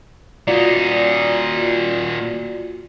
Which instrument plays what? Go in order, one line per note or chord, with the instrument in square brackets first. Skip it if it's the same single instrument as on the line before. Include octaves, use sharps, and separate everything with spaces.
[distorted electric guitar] A#2 D#4 [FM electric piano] F4 F#4 D5